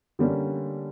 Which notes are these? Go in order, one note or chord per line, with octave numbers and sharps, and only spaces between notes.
D3 G3 A#3 C#4